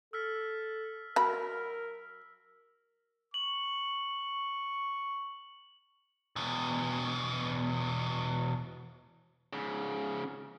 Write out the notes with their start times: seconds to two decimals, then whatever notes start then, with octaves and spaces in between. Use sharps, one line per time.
0.13 A4 E6 F6 B6
1.16 F#3 A#4 B5
3.34 C#6 F#7
6.36 E2 B2
9.53 G#2 C#3